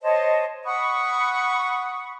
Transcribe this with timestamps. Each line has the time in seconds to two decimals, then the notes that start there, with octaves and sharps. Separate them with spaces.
0.01 C5 C#5 D#5 A5
0.64 F#5 B5 C#6 D#6